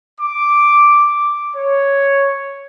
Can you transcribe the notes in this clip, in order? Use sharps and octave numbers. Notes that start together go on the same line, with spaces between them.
D6
C#5